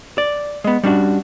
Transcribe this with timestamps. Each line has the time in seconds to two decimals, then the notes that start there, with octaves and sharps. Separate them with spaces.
0.18 D5
0.64 G#3 B3
0.84 G3 C#4 D4 F#4